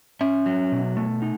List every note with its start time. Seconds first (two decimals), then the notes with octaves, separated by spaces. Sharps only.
0.21 C#4 E5
0.46 F#3
0.72 B2
0.97 A3
1.22 D#4